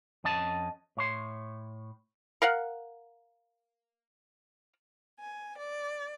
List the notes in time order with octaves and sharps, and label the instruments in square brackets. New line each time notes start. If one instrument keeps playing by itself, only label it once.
[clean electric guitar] F2 C#4 D#5 A5
A2 C#5 C6
[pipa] A#4 F5 F#5
[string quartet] G#5
D5